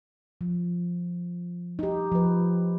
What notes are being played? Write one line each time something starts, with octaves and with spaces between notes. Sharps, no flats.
F3
D#4 G4
F3 B4